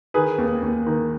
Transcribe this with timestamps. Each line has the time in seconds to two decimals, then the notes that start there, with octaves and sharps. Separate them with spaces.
0.14 D#3 G#4 B4
0.38 D#2
0.62 D#2
0.87 D#3